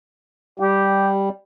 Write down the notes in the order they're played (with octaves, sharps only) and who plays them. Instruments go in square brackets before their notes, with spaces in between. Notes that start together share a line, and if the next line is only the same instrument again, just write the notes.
[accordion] G3 [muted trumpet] G4